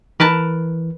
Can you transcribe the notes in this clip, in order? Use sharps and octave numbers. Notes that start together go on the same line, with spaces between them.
E3 A#4 B4 A5